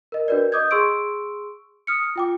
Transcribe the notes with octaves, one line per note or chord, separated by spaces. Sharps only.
A#4 D#5
D4 F#4 A#4 B4 D5
D#5 D6 D#6 G6 G#6
G#4 C6 C#6 E6 D7
D#6 F6 C#7
F4 G5 D6